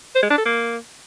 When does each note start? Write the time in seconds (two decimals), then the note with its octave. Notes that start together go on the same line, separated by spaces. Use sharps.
0.15 C5
0.23 G#3
0.30 D4
0.38 A4
0.45 A#3